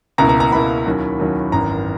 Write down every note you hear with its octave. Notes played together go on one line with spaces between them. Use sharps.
C#2 B2 A#3 E4 A#5
A#5
A#5
C#2 B2 A#3 E4 B5
D#2 D#3 F#3 C#4 E4
D#2 D#3 F#3 C#4 E4
G#1 F#2 E3 B3 A#5